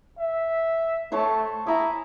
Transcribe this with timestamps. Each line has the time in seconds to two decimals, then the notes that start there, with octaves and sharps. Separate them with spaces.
0.18 E5
1.12 A3 C5 C#5 A5
1.67 E4 G#5 A#5 D#6